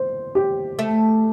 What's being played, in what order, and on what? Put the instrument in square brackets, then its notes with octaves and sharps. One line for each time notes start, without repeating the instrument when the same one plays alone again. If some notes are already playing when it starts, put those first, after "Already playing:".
Already playing: [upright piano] C5
G4
[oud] A3